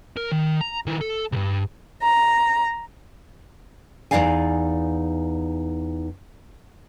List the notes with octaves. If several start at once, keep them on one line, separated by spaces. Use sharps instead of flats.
A#4
D#3
A#5
D#3 E4
A4
C2 G2
A#5
E2 E3 D#4 D5 F5 G#5